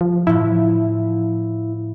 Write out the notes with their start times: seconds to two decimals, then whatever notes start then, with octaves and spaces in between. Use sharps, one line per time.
0.01 F3
0.27 A2 F3 E4